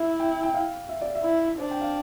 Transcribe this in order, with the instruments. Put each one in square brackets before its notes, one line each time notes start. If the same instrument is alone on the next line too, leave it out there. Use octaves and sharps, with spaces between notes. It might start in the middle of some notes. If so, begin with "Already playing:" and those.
Already playing: [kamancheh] E4 [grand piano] E5
[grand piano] G5
G5
F5
E5
D5
E5
[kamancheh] E4
[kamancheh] D4 [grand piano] C5
[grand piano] G5
F5